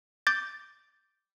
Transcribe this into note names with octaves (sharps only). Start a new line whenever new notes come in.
D6 G6 A6